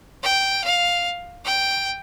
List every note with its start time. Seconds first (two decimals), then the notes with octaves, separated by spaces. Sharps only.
0.23 G5
0.64 F5
1.45 G5